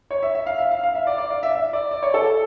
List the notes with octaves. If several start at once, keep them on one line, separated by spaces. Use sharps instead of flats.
C#5
E5
E5
F5
E5
F5
F5
E5
D5
D5
F5
E5
E5
D5
D5
C#5
A4